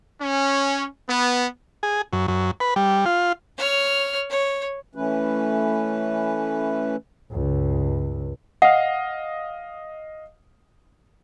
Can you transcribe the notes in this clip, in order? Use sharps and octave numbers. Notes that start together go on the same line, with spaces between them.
C#4
B3
G#4
F#2
F#2
B4
G3
F4
C#5 F6
C#5
E3 A3 C#4 B4
C#2 G2
D#5 F5 F#5